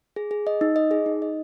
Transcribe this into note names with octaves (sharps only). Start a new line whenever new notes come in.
G#4
G#4
D#5
D#4
D#5
G#4
D#4
D#5